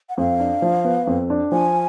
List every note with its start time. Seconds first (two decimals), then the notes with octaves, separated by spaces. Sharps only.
0.09 F#5
0.18 F2 F5
0.40 D4
0.62 F3
0.85 B3
1.07 F2
1.30 D4
1.52 F3 G#5